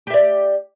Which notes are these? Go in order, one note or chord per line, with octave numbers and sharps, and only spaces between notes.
G4 D5 E5